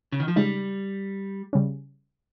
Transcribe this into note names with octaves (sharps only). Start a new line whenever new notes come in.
C#3
D#3
F3
C#3 G3 G#3 D#4
C#3 G3 C#4